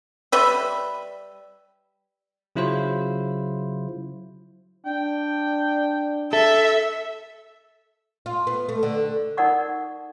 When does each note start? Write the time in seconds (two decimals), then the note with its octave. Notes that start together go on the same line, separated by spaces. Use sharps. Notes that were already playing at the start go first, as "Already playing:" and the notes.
0.32 G3 B4 E5
2.56 C#3 F#3 E4 F4 C5
4.86 D4 G5
6.33 A4 E5
8.26 F4
8.47 B3
8.69 A3
8.83 D3
9.37 D#4 A4 A#4 D5 F#5 C#6